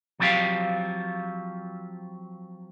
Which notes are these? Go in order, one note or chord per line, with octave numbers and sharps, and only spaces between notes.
F3 F#3 C4 F4 G4 F5